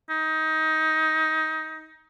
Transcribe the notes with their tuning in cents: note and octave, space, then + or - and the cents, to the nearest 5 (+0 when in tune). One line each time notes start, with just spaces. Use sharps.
D#4 +20